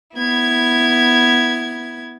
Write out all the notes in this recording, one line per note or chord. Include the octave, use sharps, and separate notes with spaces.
B3 E4 G#6